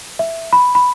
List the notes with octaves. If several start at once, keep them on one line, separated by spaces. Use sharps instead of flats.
E5
B5
B5